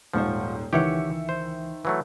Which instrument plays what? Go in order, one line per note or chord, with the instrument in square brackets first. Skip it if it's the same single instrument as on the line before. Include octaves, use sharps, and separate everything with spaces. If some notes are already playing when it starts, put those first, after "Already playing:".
[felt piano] D#1 G#2 C5 [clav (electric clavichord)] F3 [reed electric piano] F#5 C#6
[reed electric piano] C#2 E3 [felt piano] D#3 E5 C#7 [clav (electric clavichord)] G4 C#5 F#5
[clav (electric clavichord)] C5
E3 F#3 A3